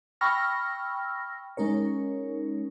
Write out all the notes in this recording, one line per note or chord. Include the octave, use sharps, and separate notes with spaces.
G5 B5 C#6 E6 F6 A#6
G#3 C#4 D#4 A#4 C#5